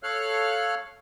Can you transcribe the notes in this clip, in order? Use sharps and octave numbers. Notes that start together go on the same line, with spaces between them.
A4 C#5 F5 F6 F#6